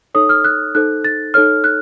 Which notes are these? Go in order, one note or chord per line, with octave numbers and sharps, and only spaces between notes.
D#4 A4 C#5 D#6
F6
F#6
D#4 A4 C5 F#6
A6
D#4 A4 C#5 F6
F#6